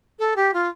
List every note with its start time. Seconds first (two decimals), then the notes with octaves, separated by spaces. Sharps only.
0.19 A4
0.36 G4
0.53 F4